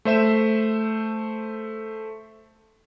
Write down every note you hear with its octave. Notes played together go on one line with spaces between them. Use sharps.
A3 C5 E5 E7